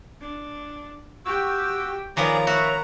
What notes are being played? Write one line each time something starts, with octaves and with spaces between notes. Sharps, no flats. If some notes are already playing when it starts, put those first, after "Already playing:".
D4
F#4 G4 G5 C#6 E6
D#3 F3 B3 G#4 A#4 C#5 D5 A#5
F#4 E5 B5 C#6